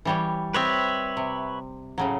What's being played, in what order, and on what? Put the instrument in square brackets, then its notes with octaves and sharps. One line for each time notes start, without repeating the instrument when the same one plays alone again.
[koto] E3 G3 C#5
[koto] C4 D#5 [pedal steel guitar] B4 C#5 E5
[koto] C3
A2 C#3 F#3